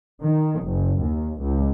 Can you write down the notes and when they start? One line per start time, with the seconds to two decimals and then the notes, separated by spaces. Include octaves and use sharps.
0.22 D#3
0.61 F#1
1.01 D#2
1.41 C#2